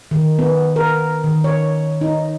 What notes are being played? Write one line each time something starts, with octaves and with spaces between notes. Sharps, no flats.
D#3
B3
A#4
D#3
C#5
D#4